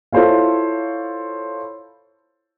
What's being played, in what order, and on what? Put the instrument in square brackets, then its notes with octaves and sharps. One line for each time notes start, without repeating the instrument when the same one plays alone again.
[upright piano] E4 F4 A4 C5 C#5 F5